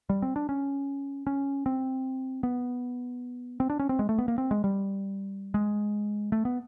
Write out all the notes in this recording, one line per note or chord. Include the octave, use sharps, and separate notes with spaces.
G3
C4
D4
C#4
C#4
C4
B3
C4
D4
C#4
C4
G#3
A3
B3
A#3
C4
G#3
G3
G#3
A3
B3